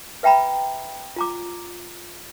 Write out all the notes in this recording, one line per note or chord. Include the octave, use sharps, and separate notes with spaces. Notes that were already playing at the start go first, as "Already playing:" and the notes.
B4 E5 G5 A#5 B5
F4 A#5 D6